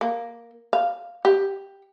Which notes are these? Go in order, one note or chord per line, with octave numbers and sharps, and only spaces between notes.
A#3
F5
G4